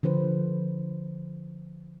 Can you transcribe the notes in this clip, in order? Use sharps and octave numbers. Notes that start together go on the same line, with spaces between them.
D3 F3 B4 C5